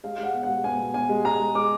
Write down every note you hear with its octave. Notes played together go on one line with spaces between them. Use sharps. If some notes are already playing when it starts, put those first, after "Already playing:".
G#3 F5
G#3
F#5
B2
F#5
G#3
B2 G#5
B2
B2 G#5
G#3
G#3 A#5
G#3
G#3 D6